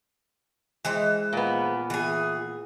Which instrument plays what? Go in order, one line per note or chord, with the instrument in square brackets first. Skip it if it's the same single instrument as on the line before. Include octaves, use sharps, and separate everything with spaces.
[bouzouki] E3 G#3 C5
[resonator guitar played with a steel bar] A#2 B3
[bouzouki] E3 G#4